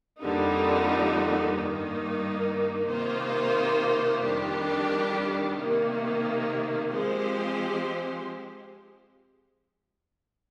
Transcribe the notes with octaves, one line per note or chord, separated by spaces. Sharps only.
F2 D3 G3 A#3 D#4
G2 D#3 A#3 D#4
C3 D#3 A#3 F4 C5
F2 D#3 G3 D4 G4
C3 D#3 A#3
F3 G#3 C4 G4 C5